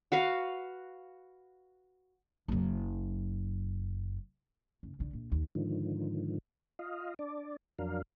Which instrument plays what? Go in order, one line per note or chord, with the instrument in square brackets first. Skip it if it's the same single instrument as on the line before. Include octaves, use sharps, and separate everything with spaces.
[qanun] F#4 B4 F5
[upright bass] F#1 F#2
F#1
B1 D3
A#1
D#2
[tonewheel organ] G#2 D3 D#3 F3
F4 D#5 F5
D4 D5
F2 F#3 D4 A#4 F5